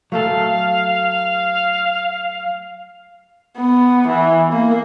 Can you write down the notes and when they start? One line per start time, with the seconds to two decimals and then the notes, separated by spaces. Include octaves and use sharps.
0.12 F#3 A3 A4 F5
3.57 B3
4.08 E3
4.53 A#3